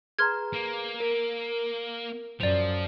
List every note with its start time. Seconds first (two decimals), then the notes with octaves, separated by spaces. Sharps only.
0.19 G#4 B4 A#5 C6 F6 G#6
0.53 A#3
1.00 A#4 D7
2.41 F#2 F3 D5 F7